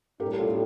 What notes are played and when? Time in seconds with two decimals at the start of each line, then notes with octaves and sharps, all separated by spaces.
0.20 A2 G3 D4 G4 A#4
0.39 F4 A4